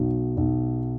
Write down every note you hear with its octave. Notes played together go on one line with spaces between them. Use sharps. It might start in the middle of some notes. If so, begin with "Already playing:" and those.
Already playing: B1 F#3
B1